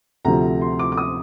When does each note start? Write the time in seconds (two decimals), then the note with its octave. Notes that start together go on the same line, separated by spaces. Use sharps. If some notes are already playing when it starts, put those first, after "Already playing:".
0.25 D2 C3 F3 A#5
0.61 C6
0.79 D6
0.92 D6
0.98 D#6